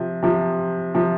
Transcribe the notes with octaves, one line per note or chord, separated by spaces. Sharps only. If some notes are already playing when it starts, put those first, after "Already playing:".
Already playing: C3 F3
C3 F3
C3 F3